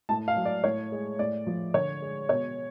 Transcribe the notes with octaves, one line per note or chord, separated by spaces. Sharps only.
A2 A5
F5
F#3
D5
A2 C#5
G#3
A2 D5
F3
D3 C#5
G#3
B2 C#5